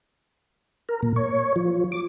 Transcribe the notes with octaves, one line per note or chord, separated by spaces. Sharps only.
A#4
A#2
C#5
F3
D6